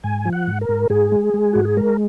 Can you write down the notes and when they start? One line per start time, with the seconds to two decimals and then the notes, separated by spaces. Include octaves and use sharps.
0.04 G#2 G#5
0.25 F3
0.33 F#5
0.47 G#2
0.61 A#4
0.69 G#2
0.90 G#2 G#4
1.12 G#3
1.34 G#3
1.53 G#2 F#4
1.65 G#4
1.77 G#3 A#4